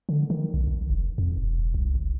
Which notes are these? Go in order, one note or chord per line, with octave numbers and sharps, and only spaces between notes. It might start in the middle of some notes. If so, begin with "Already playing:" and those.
D3
D#3
B1
A#1
F1
F2
E1
C2
F#1